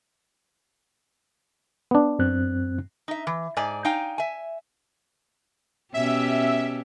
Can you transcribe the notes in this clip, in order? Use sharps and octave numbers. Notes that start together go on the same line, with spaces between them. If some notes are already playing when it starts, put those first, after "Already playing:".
B3 D4
F#2 C4 F#6
D#4 E5
E3
G#2 D5 G#5
D#4 F5 G5 G#5
E5 G#5
B2 C#4 G4 E5